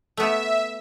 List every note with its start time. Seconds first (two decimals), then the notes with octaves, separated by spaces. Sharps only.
0.17 A3 B3 E5